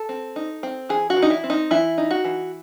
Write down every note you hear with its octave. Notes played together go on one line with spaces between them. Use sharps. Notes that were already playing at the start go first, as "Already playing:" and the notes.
Already playing: A4
C4
D#4
C4
E3 G#4
F#4
E3
D#4
E4
C4
D#4
E3 E4
D#4
F#4
E3